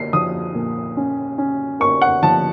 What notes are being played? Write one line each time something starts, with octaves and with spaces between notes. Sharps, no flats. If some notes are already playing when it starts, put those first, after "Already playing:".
Already playing: A#3 C7
F3 D#6
A#2
C#4
C#4
A#3 C#6
F#5
F3 A5